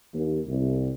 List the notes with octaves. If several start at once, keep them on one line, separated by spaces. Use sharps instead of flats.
D#2
C2